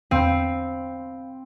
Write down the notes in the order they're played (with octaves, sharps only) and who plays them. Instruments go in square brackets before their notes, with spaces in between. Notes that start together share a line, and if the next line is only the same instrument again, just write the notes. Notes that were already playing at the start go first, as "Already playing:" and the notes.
[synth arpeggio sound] E2 E6 D#7 [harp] C4 [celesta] F5 B5 G6